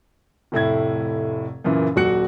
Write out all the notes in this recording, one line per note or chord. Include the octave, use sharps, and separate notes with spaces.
F1 A2 E4 G#6
F#2 A#2 C#3 E3
D#1 F#3 F#4 F#6 C#7